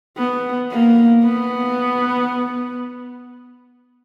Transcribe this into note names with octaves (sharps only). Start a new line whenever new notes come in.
B3
A#3
B3